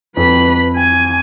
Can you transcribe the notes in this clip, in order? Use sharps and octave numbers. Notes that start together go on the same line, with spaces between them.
F2 B4 B5
G#5